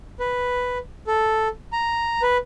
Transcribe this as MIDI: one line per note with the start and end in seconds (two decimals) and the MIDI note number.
0.20 0.78 71
1.07 1.48 69
1.73 2.22 82
2.22 2.37 71